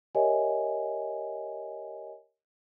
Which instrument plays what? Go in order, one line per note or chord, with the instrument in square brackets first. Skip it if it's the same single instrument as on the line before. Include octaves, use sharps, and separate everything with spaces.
[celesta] G4 A#4 C#5 D#5 E5 G#5